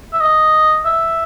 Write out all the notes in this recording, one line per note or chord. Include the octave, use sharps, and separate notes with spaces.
E5
D#5
E5